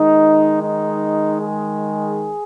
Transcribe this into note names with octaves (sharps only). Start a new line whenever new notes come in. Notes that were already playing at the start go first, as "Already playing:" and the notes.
Already playing: D#3 G#3 D#4
D#4
G#4